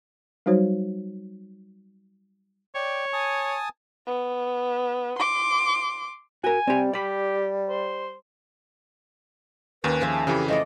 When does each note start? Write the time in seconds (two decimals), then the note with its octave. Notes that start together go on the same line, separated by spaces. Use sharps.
0.46 F#3 G3 D#4 F#4 C5 C#5
2.75 C#5 D5 G5
3.13 G#5 A5 D#6
4.07 B3
5.18 C6 D6
6.44 F#4 A#4 G#5
6.67 G3 C4 G4
6.93 G4 D5 B5
7.69 C5
9.84 D#2 D#3 C#4 B4
10.01 F3 G#4 E5
10.12 A5
10.27 F2 C#3 E3 G4 G5 B5
10.48 F3 A3 D5 D#5